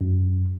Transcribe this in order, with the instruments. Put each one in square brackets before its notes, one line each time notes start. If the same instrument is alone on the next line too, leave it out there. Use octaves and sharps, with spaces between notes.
[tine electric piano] F#2